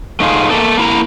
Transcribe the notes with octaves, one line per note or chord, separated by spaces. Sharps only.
A3 D#4 F4 G#4
A3 A#3 A4
A#3 E4 A#5